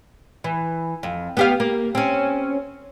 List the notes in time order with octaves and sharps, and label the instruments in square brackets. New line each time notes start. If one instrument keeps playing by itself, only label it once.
[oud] E3
F2
B3 G4 F5
A#3
C4 C#4